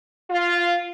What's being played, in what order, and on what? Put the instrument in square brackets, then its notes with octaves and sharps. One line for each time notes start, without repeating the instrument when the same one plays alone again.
[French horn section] F4